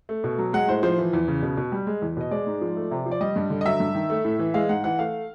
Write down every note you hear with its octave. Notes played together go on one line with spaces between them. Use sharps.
A3
B2
F#3
G#3 F#5
A2 C5
F3 C5
E3
E2
C#3
B2
B2
G3
G#3
E2
B2 D#5
G#3 D5
G#2
F3
A3
C3
F3
D5
G3 D#5
G2
D3
D#5
F#3 E5
G2
D#3
A3
A2
E3
G#3 F5
G#2 F#5
E3 F#5
A3 F5